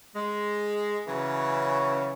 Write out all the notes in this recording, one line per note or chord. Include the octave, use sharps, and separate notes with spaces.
G#3
C#3 E3 F#3 C#4